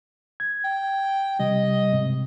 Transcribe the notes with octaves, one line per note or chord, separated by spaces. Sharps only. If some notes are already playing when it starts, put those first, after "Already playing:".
G#6
G5
C3 G3 D#5
G#2 C3